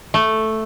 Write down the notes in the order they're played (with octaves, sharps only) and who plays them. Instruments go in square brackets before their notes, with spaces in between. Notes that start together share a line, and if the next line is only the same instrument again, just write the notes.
[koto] A3